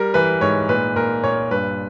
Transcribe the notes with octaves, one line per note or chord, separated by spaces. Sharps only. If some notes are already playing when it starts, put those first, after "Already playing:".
Already playing: G3 A#4
E3 B4
G#2 C#5
A#2 B4
A#2 A#4
A#2 C#5
G2 B4